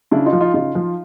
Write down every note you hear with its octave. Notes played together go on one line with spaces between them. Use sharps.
C#3 D4 E4
D#4 F4
F3
D#4 F4
C#3 D#4 F4
F3